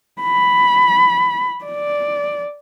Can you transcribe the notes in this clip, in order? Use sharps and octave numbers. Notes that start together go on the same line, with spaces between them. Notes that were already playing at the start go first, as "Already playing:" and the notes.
B5
D5